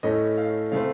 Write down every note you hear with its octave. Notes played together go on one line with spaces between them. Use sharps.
A2 A3 C#4 D#5
F5
C#3 A3 C4 F5